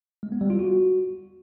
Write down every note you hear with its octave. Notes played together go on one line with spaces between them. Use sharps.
G#3
B3
G3
F4
F#4